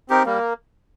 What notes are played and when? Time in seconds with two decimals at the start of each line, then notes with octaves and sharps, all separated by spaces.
0.10 C4 D#4 G4 A#4
0.25 G3 A#3